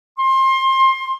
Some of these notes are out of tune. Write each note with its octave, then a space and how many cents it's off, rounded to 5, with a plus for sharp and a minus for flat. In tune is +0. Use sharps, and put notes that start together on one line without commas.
C6 +25